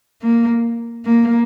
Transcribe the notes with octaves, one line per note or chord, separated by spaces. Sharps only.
A#3
A#3